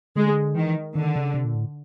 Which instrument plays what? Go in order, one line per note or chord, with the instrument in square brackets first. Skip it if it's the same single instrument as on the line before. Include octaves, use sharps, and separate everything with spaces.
[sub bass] D3 [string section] G#3
[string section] D#3 [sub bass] E3
[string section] D3 [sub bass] D#3
[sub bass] C#3
C3
A#2
A2